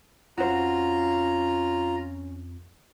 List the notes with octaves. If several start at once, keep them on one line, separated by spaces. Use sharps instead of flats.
F2 C#4 F4 F#4 C5 A#5